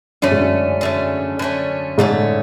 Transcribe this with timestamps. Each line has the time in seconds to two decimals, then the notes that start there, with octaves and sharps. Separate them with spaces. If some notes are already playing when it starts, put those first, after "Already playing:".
0.22 F#2 D3 A3 C#4
0.31 G#2
0.39 F#2
0.81 D3 A3 C#4
1.39 D3 A3 C#4
1.98 G#2 D3 A3 C#4
2.12 A2